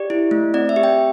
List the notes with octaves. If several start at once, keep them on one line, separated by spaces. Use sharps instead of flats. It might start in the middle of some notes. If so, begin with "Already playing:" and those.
Already playing: G4 D5
E4
A3
C4 D5
E5
G4
G5